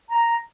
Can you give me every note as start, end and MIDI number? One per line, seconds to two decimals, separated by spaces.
0.10 0.37 82